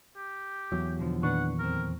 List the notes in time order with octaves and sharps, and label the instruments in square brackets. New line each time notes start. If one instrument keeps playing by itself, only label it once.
[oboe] G4
[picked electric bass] E2 F#3
[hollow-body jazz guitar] B2 D3 F3
[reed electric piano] A#2 D#3 C#6 [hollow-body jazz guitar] D4 B4 [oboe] F#5
[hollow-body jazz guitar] F2 C4 [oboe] A#4